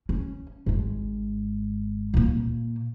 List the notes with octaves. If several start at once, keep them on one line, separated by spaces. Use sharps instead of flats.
C#4
G#1 G#3
A#2 A#3